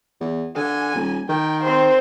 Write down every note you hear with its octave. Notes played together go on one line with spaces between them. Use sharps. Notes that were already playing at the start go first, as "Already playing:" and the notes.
E2
D3 G#5
D#1
D#3 G5
C4 C5